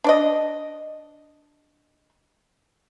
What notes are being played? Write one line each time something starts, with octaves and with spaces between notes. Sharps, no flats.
D4 D5 D#5